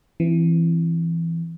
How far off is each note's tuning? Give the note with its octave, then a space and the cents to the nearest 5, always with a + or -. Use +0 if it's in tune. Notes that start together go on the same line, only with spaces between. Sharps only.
E3 +15 C4 +0